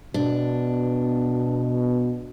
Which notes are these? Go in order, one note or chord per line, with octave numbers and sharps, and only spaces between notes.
B2 D4